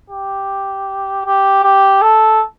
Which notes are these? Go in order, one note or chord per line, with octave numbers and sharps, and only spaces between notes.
G4
G4
G4
A4